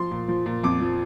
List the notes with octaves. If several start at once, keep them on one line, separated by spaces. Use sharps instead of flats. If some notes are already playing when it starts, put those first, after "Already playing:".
Already playing: F3 C6
A#2
F3
A#2
F2 D6
F3